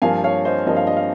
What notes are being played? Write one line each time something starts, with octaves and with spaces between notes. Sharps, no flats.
G2 F3 A#3 F5 G#5
C#5 F5
C5 D#5
G2 F3 A#3 D#5
F5
D#5
F5